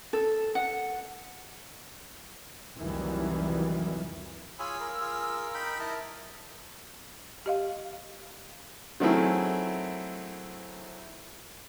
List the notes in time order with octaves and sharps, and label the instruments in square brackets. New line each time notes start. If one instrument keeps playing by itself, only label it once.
[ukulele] A4
F#5
[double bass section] F1 C2 D#3 E3 F#3 G3
[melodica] F4 G#4 [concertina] C#5 G#5 B5 [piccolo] E6
[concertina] A#4
[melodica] F4 G#4
D#4 G5 B5
[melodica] E4 D#5 [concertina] A#4 A5
[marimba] G4 D#5 F5
[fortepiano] D#3 F#3 A3 C4 E4 G#4